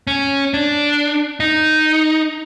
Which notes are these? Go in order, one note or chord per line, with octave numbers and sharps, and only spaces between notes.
C#4
D4
D#4